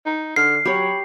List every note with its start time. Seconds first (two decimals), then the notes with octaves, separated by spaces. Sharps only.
0.05 D#4
0.36 D3 F6 C7
0.65 F#3 G4 C#5 B5